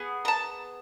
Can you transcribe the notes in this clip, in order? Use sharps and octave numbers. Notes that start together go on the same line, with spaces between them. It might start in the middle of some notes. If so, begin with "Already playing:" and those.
Already playing: B3 G#4
A#5
A5